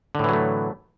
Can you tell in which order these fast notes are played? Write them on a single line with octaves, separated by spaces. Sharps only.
D3 A2 E3 F#3 A3